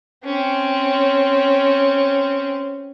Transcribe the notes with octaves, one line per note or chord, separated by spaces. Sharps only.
C4 C#4